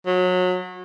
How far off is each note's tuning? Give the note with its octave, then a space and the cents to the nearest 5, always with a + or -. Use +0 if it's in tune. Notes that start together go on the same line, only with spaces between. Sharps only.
F#3 -25